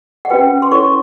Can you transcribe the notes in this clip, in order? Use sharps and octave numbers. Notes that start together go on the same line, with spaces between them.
F#5
C#4 F#4 B4 G5
C6
E4 A4 C#5 C#6